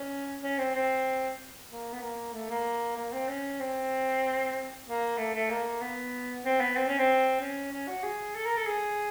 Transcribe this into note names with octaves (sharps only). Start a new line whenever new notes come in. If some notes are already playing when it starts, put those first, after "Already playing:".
Already playing: C#4
C#4
C4
C4
A#3
B3
A#3
A3
A#3
A#3
C4
C#4
C4
A#3
A3
A3
A#3
B3
C4
B3
C4
C#4
C4
C#4
C#4
F#4
G#4
A4
A#4
A4
G#4